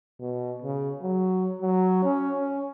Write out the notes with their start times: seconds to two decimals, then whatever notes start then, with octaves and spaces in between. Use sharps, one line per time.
0.20 B2
0.62 C#3
1.02 F#3
1.62 F#3
2.04 C#4
2.37 C#4